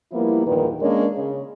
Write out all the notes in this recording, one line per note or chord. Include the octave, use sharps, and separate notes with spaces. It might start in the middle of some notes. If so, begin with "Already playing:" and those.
F3 G3 A#3 B3 E4
E2 G2 A#2 D#3 B4
G#3 A#3 C#4 D4 A#4 C#5
C#3